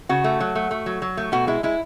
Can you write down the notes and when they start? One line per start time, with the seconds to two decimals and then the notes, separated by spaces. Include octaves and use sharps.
0.09 C#3 F#4
0.24 A3
0.40 F#3
0.55 A3
0.71 A3
0.86 F#3
1.02 F#3
1.17 A3
1.32 B2 F#4
1.47 G#3 E4
1.63 G#3 E4